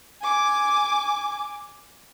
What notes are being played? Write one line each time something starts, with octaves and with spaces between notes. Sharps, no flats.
G#5 D6